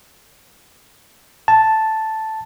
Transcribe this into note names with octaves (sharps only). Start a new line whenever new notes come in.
A5